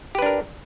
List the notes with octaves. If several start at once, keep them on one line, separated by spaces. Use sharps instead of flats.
D4 G4 A#4 B4